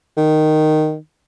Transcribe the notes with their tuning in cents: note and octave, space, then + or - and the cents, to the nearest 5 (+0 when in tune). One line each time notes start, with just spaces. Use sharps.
D#3 -10